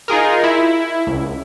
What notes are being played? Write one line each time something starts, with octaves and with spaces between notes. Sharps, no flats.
D#4 F4 G#4 A#4
E4
C#2